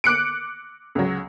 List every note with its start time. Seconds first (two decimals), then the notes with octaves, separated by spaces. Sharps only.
0.04 D6 F#6 C#7 D7
0.95 C#2 F#3